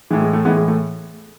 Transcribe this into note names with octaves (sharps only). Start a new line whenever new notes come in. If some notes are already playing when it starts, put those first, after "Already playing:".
A2 E3 G#3
G#3
A3
A2 E3 G#3 B3
G#3
A3